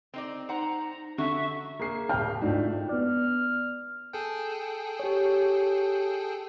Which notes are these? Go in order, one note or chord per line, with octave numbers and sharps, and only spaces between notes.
C4 D#4 D5
D#4 C5 F#5 A#5
D3 F#4 E5 C#6
A#3 G#4 C7
D1 G5 F6
G#2 A3 D4 F4 F#4
B3 D5 F6
G#4 A4 G5
G4 C#5